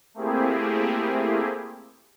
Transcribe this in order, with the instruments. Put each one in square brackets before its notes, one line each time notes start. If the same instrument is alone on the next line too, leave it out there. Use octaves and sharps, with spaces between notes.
[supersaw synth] A3 A#3 C4 E4 G4 G#4